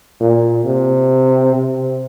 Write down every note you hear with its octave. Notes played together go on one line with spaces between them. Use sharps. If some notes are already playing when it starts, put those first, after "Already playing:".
A#2
C3
C3